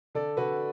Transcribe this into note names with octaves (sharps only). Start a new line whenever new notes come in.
D3 A4 D5
D3 F#4 B4